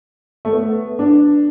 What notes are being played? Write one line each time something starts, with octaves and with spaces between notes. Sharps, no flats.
A3
B3
D4